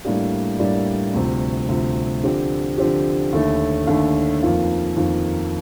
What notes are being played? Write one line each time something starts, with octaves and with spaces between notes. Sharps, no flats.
A2 G3 A#3 D4 G4
A2 G3 A#3 D4 G4
D2 C3 F3
D2 C3 F3
D3 F3 C4 G4
D3 F3 C4 G4
D#2 D3 A3
D#2 D3 A3
F2 D#3 A#3 F4
F2 D#3 A#3 F4